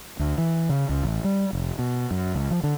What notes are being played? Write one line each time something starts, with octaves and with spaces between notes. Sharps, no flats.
D2
E3
C#3
C#2
A1
G3
F1
B2
F#2
C#2
F3
D3